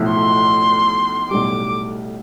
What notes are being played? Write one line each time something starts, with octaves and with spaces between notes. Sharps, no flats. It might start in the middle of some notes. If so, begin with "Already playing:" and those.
Already playing: B1 A2 F3 A3 E4
C6
B1 A2 G3 D6